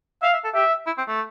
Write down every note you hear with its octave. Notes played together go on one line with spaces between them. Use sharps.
E5 F5
E5
A4
G4 E5
E4
C4
A3